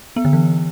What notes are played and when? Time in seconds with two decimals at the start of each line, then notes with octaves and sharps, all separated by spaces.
0.16 B3
0.25 D3
0.33 E3